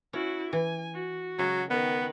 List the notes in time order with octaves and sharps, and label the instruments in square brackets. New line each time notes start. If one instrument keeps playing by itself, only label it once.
[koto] C#4 [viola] E4 F#4
[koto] E3 [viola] G#5
[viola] F#4
[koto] C#3 G#3 [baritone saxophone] F#3
[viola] D#3 B4 [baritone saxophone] B3